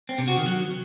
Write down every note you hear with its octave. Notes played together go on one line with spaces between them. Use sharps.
C4
C3
F#4
D#3
F#3